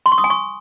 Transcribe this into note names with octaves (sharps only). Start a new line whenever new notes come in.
C6
C#6
D#6
G#5
C#6